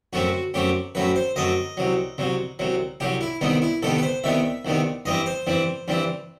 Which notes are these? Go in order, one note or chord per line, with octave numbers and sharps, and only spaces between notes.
F#2 F#3 A3 C4 F#4
F#2 F#3 A3 C4 G4
F#2 F#3 A3 C4 B4
C5
F#2 F#3 A3 C4 D#5
C2 C3 F#3
C2 C3 F#3
C2 C3 F#3
C2 C3 F#3 G4
E4
C2 C3 D#3 G3 B3 D#4
E4
C2 C3 D#3 G3 B3 A4
B4
C5
C2 C3 D#3 G3 B3 E5
C2 C3 D#3 G3 B3
G2 E3 G3 C4 D#5
C5
G2 E3 G3 C4
G2 E3 G3 C4